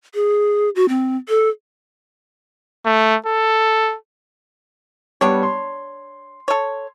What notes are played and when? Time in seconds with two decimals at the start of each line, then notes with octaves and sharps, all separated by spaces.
0.15 G#4
0.76 F#4
0.89 C4
1.29 A4
2.85 A3
3.26 A4
5.21 G3 B3 D4 C#5
5.43 C6
6.48 A4 C#5